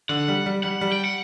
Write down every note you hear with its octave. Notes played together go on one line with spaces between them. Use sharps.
D3 F#5
G3
G3
G3 F#5
G3
G5
F#5